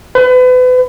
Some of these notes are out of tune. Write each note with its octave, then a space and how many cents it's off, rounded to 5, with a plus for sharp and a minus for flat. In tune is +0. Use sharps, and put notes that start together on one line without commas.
B4 +35